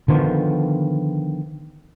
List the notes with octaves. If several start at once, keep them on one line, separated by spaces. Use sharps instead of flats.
D3 D#3 F3 B3